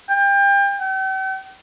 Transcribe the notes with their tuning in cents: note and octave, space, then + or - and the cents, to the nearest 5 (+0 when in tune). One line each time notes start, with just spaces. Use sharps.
G5 +30
G5 -45